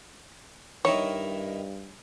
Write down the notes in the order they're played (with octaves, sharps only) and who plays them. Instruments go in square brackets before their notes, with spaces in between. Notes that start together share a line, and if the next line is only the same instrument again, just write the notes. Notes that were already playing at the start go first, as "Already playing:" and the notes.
[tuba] G2 [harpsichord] D#3 D#4 E4 [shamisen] C#5